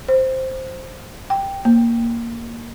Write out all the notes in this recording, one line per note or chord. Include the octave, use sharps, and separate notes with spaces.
C5
G5
A#3